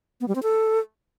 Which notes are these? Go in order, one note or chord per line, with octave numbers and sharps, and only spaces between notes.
B3
G3
C4
A4